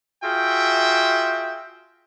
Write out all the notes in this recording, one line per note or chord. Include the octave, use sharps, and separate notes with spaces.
F4 F#4 G#4 E5 G5